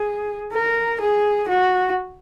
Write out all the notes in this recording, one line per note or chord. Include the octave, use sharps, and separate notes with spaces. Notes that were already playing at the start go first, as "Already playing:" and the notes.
Already playing: G#4
A#4
G#4
F#4